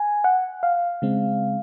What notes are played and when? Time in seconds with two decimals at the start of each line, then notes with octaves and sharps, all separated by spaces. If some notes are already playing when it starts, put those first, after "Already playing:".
Already playing: G#5
0.24 F#5
0.63 F5
1.02 C#3 G#3 C4